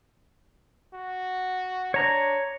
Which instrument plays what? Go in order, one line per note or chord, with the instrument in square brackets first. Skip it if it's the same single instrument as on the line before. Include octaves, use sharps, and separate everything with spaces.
[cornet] F#4
[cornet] D4 [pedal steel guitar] C#5 A#5